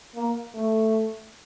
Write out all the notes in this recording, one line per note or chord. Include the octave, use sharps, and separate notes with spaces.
A#3
A3